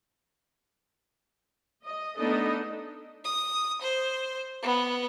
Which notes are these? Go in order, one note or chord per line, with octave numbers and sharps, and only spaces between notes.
D#5
A3 B3 D4 D#4 A4 D#5
D#6
C5
B3